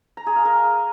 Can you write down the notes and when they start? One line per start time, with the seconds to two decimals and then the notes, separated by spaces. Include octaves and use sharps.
0.17 A#5
0.27 G#4
0.36 F5
0.45 A#4